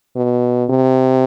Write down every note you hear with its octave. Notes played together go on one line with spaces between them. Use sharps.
B2
C3